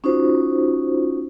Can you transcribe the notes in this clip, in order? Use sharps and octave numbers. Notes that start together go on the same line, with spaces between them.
C#4 D#4 F4 F#4 C5